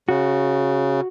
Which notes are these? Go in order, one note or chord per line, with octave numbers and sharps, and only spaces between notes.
C#3 F#4